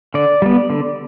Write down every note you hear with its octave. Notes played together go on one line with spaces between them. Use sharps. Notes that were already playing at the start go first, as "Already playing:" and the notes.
D3 D5
G3 B3
D3